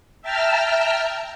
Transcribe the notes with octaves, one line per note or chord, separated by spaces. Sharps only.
E5 G5 A5 A#5 E6 F6